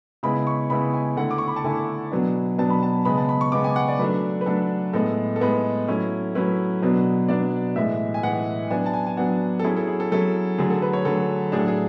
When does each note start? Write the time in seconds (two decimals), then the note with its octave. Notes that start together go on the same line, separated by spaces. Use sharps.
0.23 C#3 G#3 B3 E4 B5
0.47 C#6
0.70 C#3 G#3 B3 E4 B5
0.93 G#5
1.17 D3 A3 E4 F#5
1.31 D6
1.38 C#6
1.48 B5
1.56 A5
1.64 D3 A3 E4 G#5
2.12 B2 F#3 B3 D4
2.58 B2 F#3 B3 D4 A5
2.70 B5
2.83 A5
3.05 C#3 G#3 B3 B5
3.17 A5
3.29 B5
3.41 C#6
3.52 C#3 G#3 B3 D6
3.64 G#5
3.76 F#5
3.88 D5
3.99 F#3 A3 D4 B4
4.41 B4
4.46 F#3 A3 D4 A4
4.93 A2 G#3 B3 A4
5.36 A4
5.40 A2 G#3 B3 B4
5.88 F#3 A3 C#4 E4
6.35 F#3 A3 C#4 E4 B4
6.82 B2 F#3 B3 D4
7.28 B2 F#3 B3 D4 D5
7.76 A2 E3 G#3 E5
8.14 G#5
8.23 A2 E3 G#3 F#5
8.70 F#3 B3 D4 G#5
8.86 A5
8.93 G#5
9.07 G#5
9.17 F#3 B3 D4 F#5
9.59 A4
9.64 F#3 C#4 E4 G#4
9.76 A4
9.88 G#4
10.00 A4
10.12 F#3 C#4 E4 A4
10.58 D3 F#3 A3 G#4
10.70 A4
10.82 B4
10.93 C#5
11.05 D3 F#3 A3 A4
11.52 A2 F#3 A3 D4 G#4
11.59 A4
11.68 G#4